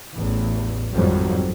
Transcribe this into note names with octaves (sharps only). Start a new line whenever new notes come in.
A1 E2
G#1 F2 F#3 G3